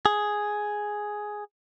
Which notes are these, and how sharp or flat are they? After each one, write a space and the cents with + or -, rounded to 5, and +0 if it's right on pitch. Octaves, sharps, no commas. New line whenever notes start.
G#4 +5